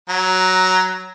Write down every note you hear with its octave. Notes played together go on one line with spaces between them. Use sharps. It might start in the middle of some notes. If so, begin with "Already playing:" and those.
F#3 A#5